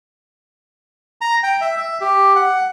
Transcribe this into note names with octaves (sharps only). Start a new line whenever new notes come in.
A#5
G5
E5
E5
G4
F#5